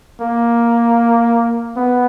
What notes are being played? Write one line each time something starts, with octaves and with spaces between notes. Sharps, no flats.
A#3
B3